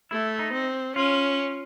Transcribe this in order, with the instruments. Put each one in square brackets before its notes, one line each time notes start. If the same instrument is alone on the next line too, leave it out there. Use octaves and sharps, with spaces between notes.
[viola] A3 [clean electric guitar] E4
[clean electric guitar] D#4
[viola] C4
[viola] C#4 [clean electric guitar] F4